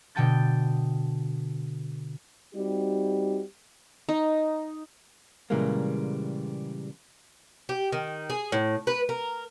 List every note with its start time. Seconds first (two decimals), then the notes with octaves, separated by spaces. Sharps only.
0.15 B2 D3 G5 A5 G6 A6
2.55 G3 C4 D#4 F#4 G4
4.09 D#4
5.50 A#2 C#3 E3 G3 G#3 A#3
7.69 G4
7.92 D#3
8.30 G#4
8.52 A2
8.87 B4
9.09 A#4